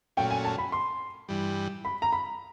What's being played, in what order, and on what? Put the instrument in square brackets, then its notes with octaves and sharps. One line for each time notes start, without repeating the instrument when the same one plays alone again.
[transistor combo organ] A#2 F#3 A3 C#4 [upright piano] G5
[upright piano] G#5
A5
B5
C6
[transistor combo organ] G2 E3 G3
[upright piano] B5
A#5
B5